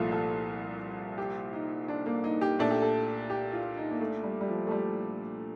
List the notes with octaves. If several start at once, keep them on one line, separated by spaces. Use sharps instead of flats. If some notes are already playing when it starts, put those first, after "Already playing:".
Already playing: C2 A#2 F3 A3 F4
A4
G4
D#4
D4
A#3
D#4
G4
A#2 A3 D4 A4
G4
A4
G4
F4
D#4
A#3
A3
G3
G3
F3
A3
G3